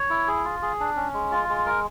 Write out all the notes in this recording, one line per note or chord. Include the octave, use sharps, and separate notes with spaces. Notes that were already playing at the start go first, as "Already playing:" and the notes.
Already playing: C#5
E4
G#4
F4
G#4
D4
C#4
G#3
F4
G#3
A#4